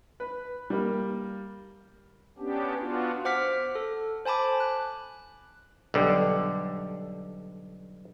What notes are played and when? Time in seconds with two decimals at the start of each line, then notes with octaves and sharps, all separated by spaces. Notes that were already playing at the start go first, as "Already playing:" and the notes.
0.20 B4
0.70 G3 A#3
2.38 B3 C#4 D4 G4
2.79 B3 D4 F4 F#4
3.25 C5 F#5 D6 F6 B6
3.75 A4
4.25 C5 G#5 A5 B5 D6
4.60 F#6
5.94 B1 D3 G3